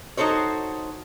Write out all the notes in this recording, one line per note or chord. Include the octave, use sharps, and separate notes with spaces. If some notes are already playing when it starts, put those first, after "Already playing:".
D#4 F#4 A4 C5 C#5